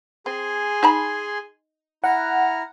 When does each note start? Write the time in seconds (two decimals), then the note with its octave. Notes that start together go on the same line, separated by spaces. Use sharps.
0.26 C4 G#4 G#5 C6
0.83 D#4 A5 B5
2.04 E4 F#5 A#5 F6